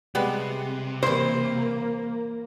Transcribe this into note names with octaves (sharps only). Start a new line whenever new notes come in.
C3 G3 G#3 B3
E3 A#3 E4 C5